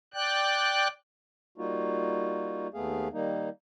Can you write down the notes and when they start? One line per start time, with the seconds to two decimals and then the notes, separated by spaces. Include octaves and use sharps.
0.14 D5 G5 F#6
1.58 G3 A#3 D#4 F4 F#4
2.74 D#2 A3 B3 G#4 F5
3.13 D#3 G3 A#3 D#4